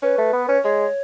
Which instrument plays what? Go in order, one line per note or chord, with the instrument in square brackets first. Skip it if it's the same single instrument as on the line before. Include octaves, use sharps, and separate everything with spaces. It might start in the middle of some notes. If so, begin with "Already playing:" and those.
[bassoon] C#4 [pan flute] B4
[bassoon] A3
B3
C#4
[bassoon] G#3 [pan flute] C#5